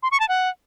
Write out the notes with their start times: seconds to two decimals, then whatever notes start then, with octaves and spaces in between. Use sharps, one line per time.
0.03 C6
0.11 C#6
0.20 A5
0.29 F#5